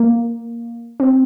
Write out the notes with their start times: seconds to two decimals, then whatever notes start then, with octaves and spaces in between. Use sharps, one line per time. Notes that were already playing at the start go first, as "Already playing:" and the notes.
Already playing: A#3
1.00 C4